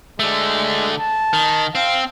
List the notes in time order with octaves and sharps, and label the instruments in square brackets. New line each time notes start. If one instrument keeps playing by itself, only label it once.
[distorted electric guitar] D3 A3 [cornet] G#3
[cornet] A5
[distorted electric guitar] D#3
[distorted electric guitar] C4 [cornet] F5